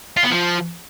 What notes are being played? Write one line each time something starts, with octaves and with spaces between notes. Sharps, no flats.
F4
B3
F3